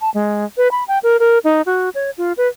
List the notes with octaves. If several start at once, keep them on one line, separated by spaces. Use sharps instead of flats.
A5
G#3
B4
B5
G5
A#4
A#4
D#4
F#4
C#5
F4
B4